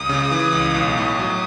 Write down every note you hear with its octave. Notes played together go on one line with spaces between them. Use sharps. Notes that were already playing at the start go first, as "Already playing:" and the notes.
Already playing: C#2 D#6
C#3
E3
C#2
B1
A2
F#3